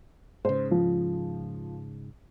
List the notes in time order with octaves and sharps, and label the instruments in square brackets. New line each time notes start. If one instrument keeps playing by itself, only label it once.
[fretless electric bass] G#2 C#3 [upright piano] C5
[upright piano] F3